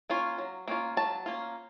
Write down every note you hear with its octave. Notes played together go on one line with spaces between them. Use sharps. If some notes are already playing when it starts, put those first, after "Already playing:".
A#3 C#4 F4
F#3
A#3 C#4 F4
F#3 A5
A#3 C#4 F4